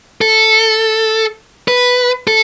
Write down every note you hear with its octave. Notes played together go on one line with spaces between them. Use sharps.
A4
B4
A4